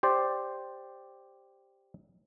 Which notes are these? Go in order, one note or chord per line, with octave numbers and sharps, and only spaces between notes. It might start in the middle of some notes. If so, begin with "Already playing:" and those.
G4 C5 D5